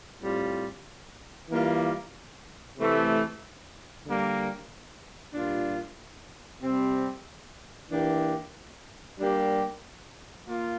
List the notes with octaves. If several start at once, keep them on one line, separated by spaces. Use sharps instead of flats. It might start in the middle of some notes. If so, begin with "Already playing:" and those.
A2 G3 C4 F4
E3 G3 A#3 F4
C3 E3 A3
D3 G3 A#3
A#2 G3 D4 F4
C3 G3 C4
E3 A#3 D4 G4
G3 A#3 D4 G4
A#3 F4